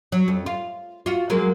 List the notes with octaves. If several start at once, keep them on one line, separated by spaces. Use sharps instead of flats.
F#3
F2
F4
F4 F#4
F#3 G#3 A#3